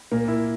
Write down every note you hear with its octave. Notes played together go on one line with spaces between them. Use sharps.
A#2 A#3
E4